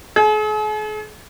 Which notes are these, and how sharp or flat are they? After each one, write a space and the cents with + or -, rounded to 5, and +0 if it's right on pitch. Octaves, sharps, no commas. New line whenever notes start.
G#4 +45